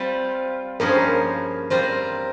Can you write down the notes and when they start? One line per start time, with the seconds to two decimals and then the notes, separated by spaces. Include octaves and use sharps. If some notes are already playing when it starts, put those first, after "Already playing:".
Already playing: G3 C4 F4
0.80 G2 F3 A#3 C#4 G#4 A#4
0.89 C5
0.97 A#4
1.70 G3 C4 F4 A#4 C5